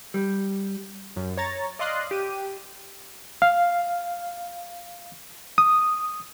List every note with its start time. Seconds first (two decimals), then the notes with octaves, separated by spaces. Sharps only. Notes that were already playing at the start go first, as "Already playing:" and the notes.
0.14 G3
1.16 F#2
1.37 C#5 A#5 A6
1.79 D5 D#5 F5 C6 D#6 F#6
2.11 G4 D#7
3.42 F5
5.58 D#6